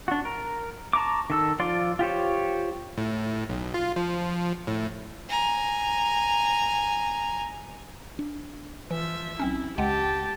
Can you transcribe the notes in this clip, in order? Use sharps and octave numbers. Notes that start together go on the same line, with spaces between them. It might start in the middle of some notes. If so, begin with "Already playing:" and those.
D4 F#4
A#4
A5 A#5 C#6 D6
D#3 A4 E6
F3 F4 D5 C6
F4 G4 C5 C#5
A2
B1
F4
F3
A2
G#5 A#5
D4
E3 F3 E5
B1 C4 C#4 E4
C#2 G#3 G4 F#5 G5 A5